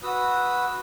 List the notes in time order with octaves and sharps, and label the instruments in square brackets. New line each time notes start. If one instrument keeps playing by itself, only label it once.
[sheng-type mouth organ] F#4 B4 D#6 E6